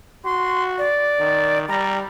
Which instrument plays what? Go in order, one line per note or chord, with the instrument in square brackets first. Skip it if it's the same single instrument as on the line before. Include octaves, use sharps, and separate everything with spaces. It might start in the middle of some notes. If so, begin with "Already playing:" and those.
[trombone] F#4 [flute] C6
[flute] D5
[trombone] D#3
[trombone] G3 [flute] A#5